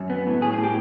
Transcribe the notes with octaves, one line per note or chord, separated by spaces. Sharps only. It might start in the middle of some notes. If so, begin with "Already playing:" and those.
Already playing: F#2
B3
A2
A2 G#4
G#4
A2
G4